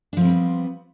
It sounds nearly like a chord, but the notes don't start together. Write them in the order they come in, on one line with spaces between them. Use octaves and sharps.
D4 F3 C4 G3 B3